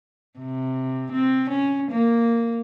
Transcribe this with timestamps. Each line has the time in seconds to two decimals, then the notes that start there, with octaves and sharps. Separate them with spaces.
0.39 C3
1.12 C4
1.50 C#4
1.91 A#3